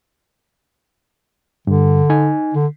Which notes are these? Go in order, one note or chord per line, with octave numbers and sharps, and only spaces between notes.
G2 D3
D#4 G#5
D3